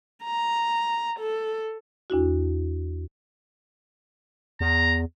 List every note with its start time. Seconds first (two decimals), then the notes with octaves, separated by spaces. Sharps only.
0.24 A#5
1.20 A4
2.10 E2 D4 E4 F#4
4.61 E2 A#5